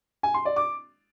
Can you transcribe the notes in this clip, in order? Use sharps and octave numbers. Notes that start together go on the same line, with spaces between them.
G#5
C6
D5
D6